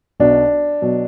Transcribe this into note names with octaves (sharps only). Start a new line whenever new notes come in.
B1 B2 F#3 D4
B2 F#3